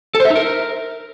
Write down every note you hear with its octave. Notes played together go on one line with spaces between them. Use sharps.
A4
C5
E5
D#4
A#4